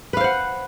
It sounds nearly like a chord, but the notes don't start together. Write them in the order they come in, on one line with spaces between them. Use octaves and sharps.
B4 F5 C5 F#5